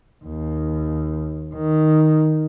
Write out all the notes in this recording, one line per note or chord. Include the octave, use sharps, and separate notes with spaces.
D#2
D#3